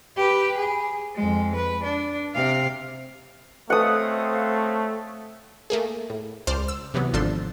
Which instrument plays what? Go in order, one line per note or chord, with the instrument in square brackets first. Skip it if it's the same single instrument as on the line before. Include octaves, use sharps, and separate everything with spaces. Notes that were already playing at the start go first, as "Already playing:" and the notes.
[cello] G4 B4
G#4
F2 G#3
B4
D4
C3 F5
[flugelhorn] A3 [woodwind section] C4 C#5 F5 [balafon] A4 B4 [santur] F#5 D#6
[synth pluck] A3 A#3 G#4
A2
C#2 C5 D5 F6
E6
C3 E3 F#3 B3
G#1 F3 D4 A4 C6